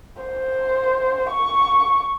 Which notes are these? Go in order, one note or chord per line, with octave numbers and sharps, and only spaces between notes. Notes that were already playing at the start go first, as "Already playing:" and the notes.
C5
C#6